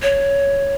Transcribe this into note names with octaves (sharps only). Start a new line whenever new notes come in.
C#5